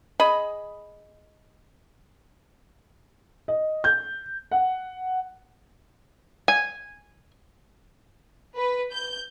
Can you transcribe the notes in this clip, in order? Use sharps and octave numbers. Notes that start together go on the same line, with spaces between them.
G#4 D#5 B5
D#5
G6
F#5
G#5
B4
G6